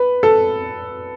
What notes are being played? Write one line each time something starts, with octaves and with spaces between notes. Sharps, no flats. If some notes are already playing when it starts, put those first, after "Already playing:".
Already playing: B4
A4